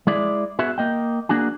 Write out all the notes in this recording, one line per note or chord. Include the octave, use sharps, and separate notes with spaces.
G#3 E4 D5
B3 F#4 G#4 E5
A#3 D#5 G5
A#3 D4 F#4 G#4